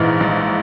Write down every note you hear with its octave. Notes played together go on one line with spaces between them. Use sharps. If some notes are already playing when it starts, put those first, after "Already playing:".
Already playing: A#1 G#2 E3 F6
A#1